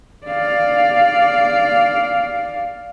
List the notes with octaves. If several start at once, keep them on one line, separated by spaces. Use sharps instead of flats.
D5 F5